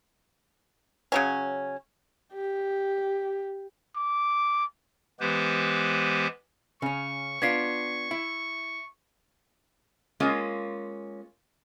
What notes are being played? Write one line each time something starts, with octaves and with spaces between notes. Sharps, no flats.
C#3 F#3 C#4
G4
D6
E3 G#3 B3 G4 B4 C5
C#3 C#4 C#6
B3 D4 F4 G#6 B6 C7
E4
G#3 A#3 C#4 F4